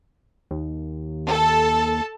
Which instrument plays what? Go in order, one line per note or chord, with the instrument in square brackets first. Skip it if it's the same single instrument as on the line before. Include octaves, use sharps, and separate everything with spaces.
[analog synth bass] D#2
[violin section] A4 A5